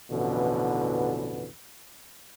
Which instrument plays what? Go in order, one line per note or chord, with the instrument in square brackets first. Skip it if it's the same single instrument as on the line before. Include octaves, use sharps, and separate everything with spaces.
[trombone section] A1 F2 B2 D3 E3 B4